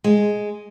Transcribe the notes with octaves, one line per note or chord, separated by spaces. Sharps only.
G#3